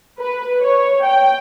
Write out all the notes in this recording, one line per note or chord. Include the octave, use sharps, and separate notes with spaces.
B4
C#5
G5